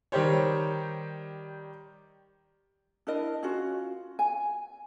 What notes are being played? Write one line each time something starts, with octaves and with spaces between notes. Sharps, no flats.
D#3 G3 G4 C5 C#5
D4 E4 A#4 D#5
C#4 F4 F#4
G#5